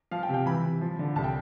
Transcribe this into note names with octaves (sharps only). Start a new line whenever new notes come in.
F3 F5
G5
C3
G5
E3 B5
C3
F3
D3
C2 A5
G5